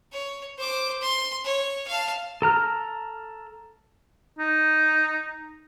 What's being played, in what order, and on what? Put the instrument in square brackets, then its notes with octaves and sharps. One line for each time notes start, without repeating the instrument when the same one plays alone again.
[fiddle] C#5
C5 D6
C6
C#5
F5 A5
[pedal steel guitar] A4 A#5 F6
[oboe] D#4